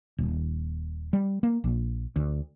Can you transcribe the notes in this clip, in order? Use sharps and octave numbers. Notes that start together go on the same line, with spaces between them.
D#1
G3
A#3
A#1
D2